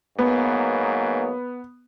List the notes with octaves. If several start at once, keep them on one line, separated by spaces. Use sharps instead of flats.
G#2 F#3 A#3 B3